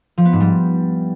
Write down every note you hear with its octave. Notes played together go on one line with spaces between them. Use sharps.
F3
B3
G#2
G3